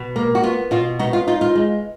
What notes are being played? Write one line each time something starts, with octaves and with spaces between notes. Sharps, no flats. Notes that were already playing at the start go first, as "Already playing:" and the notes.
Already playing: B2
A#3
F#4
B3 F4
B2 F4
B3 D#4 F#4
F4
D#4 F4
F4
G#3